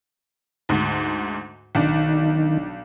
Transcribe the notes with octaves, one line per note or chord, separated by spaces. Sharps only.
D2 G#2
B1 D#3 D4